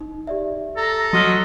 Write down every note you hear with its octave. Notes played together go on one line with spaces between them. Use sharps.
D#4
G4 D5 E5
A4 A#5
F#3 D#5 C6 F6 B6